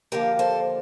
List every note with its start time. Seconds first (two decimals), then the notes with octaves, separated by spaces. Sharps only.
0.12 D#2 D3 F3 A#3 G4 A#4
0.39 A4 C5